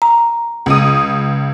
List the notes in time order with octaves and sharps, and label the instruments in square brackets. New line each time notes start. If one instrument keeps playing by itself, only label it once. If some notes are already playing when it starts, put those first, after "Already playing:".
[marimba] A#5
[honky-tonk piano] C#2 D#6